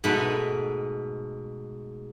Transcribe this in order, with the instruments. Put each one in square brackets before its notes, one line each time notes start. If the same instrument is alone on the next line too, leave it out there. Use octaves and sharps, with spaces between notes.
[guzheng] G#2 B2 A3 G#5 B5